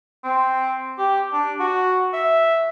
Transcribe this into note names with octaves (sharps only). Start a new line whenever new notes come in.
C4
G4
D4
F#4
E5